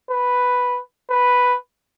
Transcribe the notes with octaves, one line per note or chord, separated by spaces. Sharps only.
B4
B4